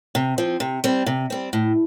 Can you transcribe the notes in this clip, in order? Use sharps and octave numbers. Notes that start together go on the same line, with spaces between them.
C3
F3 C4
C3
G3 C4
C3
G3 C4
A2